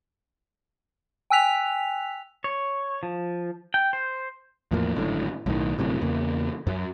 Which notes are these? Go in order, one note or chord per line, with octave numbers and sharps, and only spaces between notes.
G5 G#5 E6 F#6 B6 F7
C#5
F3
G5
C5
E2 A2 F3 A#3
G#1 F#2 A2 D3
B1 A2 C3 D#3
G1 F#2 A2 C3
E2 C#3 A#3
F#2 F#3